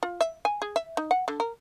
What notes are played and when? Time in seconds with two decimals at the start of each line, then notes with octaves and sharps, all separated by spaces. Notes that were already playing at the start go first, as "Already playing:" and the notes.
0.03 F4
0.21 E5
0.45 G#5
0.62 G#4
0.76 E5
0.97 D#4
1.11 F#5
1.28 D3
1.40 A#4